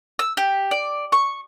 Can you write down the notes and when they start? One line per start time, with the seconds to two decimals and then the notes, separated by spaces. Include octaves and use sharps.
0.19 E6
0.37 G4
0.71 D5
1.12 C#6